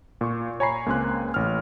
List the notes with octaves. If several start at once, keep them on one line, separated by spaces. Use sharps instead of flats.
A#2 C#6
C#5 G#5 A#5 B5 C7
C#2 A#3 C4 G#5 C6 F#6
A1 F6